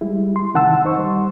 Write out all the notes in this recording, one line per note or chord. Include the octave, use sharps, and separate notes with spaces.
G3 G#3 E4
C6
C3 D#3 F#5 A5 E6
F#2 D#4 C5 C#6
G3 C6